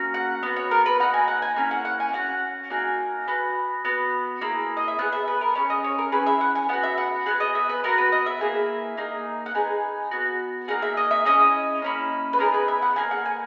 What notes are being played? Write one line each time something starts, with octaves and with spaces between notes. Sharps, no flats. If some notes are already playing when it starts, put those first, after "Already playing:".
Already playing: A#3 C#4 F#4
F#5
B3 F#4
C#5
A#4
B4
A#3 D#4 F#4 F#5
G#5
F#5
G#5
A#3 C#4 E4 G#5
F#5
F#5
G#5
C#4 F#4 F#5
A#3 D#4 F#4 G#5
B3 F#4
B3 F#4
A#3 E4 G#4
D#5
E5
B3 E4 G#4 F#5
E5
B4
A#4
C#4 E4 G#4 C#5
D#5
C#5
A#4
C#4 E4 G#4 B4
E5
F#5
G#5
B3 F#4 F#5
E5
F#5
B3 E4 G#4 F#5
D#5
E5
B4
B3 F#4 A#4
B4
D#5
E5
A#3 E4 G#4
A#3 D#4 G#4
F#5
B3 D#4 G#4 G#5
B3 F#4
A#3 D#4 G#4 F#5
E5
D#5
E5
C#4 E4 G#4 D#5
A#3 C#4 E4
B4
B3 D#4 G#4 A#4
B4
E5
F#5
A#3 E4 G#4 G#5
F#5
G#5